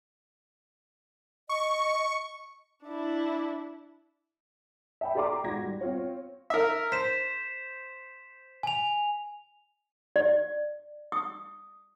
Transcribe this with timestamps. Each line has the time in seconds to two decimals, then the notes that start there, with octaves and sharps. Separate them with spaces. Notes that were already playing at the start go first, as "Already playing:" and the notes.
1.49 D#5 C#6
2.85 D4 E4
5.01 E5 G5 B5
5.15 G4 A4 D5 A#5 C6 D6
5.44 G#2 F4 F#4 G#6 A#6
5.63 G3
5.81 C4 F4 C#5
6.50 A#4 E5
6.92 C5 B6 E7
8.63 G#5 F7
10.16 D5
11.12 D#6